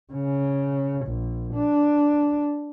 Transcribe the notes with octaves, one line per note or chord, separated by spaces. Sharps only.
C#3
A#1
D4